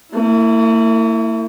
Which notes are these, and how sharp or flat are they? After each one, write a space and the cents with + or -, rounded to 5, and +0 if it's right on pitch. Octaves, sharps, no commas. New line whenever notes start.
A#3 -45 E4 +0